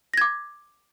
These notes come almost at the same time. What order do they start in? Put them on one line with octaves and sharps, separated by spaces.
A#6 G#6 D6